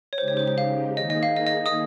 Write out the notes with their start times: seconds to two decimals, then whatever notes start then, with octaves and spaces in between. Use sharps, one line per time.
0.13 C#5
0.18 C#3 G#3 D#4 G4 C5
0.28 C#5
0.37 C5
0.47 C5
0.58 F5
0.97 D#3 A#3 D#4 G#4 D#5
1.10 D#5
1.23 F5
1.36 D#5
1.47 D#5
1.66 D#5 D#6